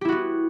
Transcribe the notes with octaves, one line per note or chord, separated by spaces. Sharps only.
B3 E4 F#4 G4